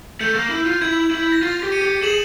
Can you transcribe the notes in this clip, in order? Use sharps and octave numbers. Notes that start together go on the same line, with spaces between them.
A3 G6
A#3
E4
F4
E4 G#6
E4
A#6
F4 A6
G4
C#7 D#7
G4
G#4 E7 F#7